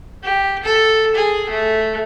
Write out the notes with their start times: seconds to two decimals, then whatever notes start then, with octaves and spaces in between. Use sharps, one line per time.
0.23 G4
0.64 A4
1.15 G#4
1.50 A3